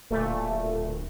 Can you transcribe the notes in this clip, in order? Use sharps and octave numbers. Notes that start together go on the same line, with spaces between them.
D1 A#2 A3